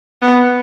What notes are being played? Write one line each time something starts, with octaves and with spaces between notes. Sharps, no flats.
B3